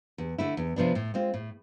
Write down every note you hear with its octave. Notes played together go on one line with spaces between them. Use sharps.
E2
D3 A3 E4
E2
C3 F3 B3 D4
A2
G#3 C4 F4
A2